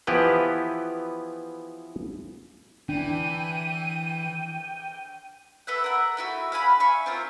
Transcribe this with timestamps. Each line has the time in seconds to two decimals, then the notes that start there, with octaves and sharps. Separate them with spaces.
0.07 E3 F3 B3 E4 G4 B4
2.89 E3 D4 G5 D#7
5.67 A4 B4 E5 F#5
5.84 A#4 F#5
6.17 A3 E4 F#4
6.52 F5 F#5 G#5 B5
6.80 E5 G#5 C#6
7.06 C4 F4 A#4